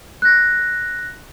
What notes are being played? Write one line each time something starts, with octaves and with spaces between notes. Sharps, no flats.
F#6 A#6